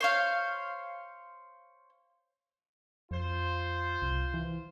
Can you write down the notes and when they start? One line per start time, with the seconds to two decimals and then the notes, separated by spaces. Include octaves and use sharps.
0.01 C5 C#5 F5
3.11 F2 F4 C5
4.02 C2
4.34 E3